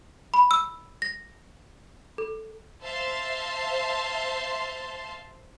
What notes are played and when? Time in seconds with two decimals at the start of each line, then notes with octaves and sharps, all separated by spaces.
0.34 B5
0.51 E6
1.02 A#6
2.18 A4
2.82 C5 E5 F5 A5 C6